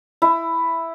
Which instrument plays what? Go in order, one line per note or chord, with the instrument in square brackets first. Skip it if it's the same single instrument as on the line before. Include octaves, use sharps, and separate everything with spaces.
[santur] E4